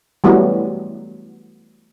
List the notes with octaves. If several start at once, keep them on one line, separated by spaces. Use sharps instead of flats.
E3 F#3 G3 A3 B3